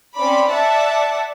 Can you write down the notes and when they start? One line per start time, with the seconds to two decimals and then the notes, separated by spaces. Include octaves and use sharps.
0.16 C4 C#4 D5 B5
0.50 D5 E5 F#5 A5